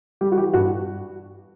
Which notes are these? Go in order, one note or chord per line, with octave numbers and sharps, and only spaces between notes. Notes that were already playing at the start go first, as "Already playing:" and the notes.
G3 G4
F#4
E3 G4
G2 F#4